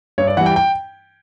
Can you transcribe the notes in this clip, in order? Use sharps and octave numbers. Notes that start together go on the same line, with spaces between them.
G2 C#5
D5
E3 G3 F#5
G5
G5